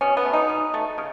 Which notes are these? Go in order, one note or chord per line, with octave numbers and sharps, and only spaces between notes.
B2 C#4
B3
A3
D#4
B2
A3
C#3